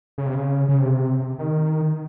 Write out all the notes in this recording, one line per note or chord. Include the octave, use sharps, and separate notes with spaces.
C#3
C3
C#3
C#3
C3
D#3